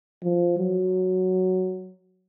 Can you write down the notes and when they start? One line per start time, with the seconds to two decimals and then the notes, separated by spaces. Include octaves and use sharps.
0.23 F3
0.58 F#3